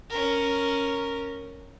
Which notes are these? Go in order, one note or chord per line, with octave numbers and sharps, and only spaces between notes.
C#4 A#4